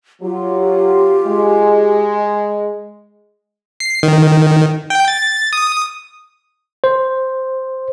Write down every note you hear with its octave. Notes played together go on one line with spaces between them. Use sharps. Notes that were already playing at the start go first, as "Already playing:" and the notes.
F#3 F4 G4
G#3
C7
D#3
G5
A6
D#6
C5